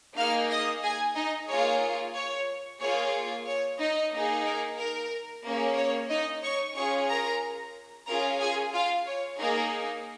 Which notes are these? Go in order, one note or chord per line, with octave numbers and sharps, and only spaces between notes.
A#3 D#4 G#4 F5 F6
D#5 D#6
G#4 G#5
D#4 D#5
A#3 F4 G#4 C#5
C#5
A#3 F4 G#4 C#5
C#5
D#4 D#5
A#3 D#4 G#4
A#4
A#4
A#3 C#4 G#4
C#5
D#4 D#5
C#5 C#6
C#4 F4 G#4 C#5 C#6
A#4 A#5
C#4 F4 G#4 A#4 A#5
G#4 G#5
F4 F5
C#5
A#3 D#4 G#4 A#4